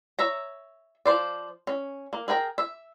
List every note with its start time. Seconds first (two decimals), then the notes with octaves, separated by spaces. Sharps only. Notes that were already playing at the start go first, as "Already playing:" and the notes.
0.19 C#5 E5 A#5
1.05 F3 C5 D5
1.67 C#4
2.13 A#3
2.28 G#4 A#4 G5 A#5
2.58 E5